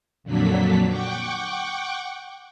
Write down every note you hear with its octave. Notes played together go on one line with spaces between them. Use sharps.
F2 A#2 D3 F#3 D4 B6
F#5 G5 C#6 D6